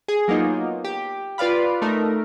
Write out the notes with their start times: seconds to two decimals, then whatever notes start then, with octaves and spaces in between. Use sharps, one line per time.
0.08 G#4
0.28 F#3 A#3 B3 D#4 F4
0.84 G4
1.38 F4 B4 D5 F5 B5
1.82 A3 D#4 A#4